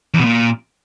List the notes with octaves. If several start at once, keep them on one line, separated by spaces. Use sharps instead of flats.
E2
B2
A#2